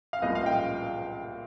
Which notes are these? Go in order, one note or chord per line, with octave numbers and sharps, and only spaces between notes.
F5
C2 A#2 F3 D#5
F5
G5